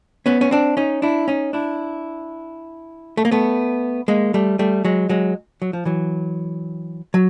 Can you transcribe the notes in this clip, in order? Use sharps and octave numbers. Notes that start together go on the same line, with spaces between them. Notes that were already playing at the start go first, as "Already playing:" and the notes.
B3 C#4
C#4
C4 D4
C#4 D#4
D4 E4
C#4 D#4
D4 E4
A3
A#3
A3 B3
G#3 A#3
G3 A3
G3 A3
F#3 G#3
F#3 G#3
F#3
F3
E3 F#3
F#3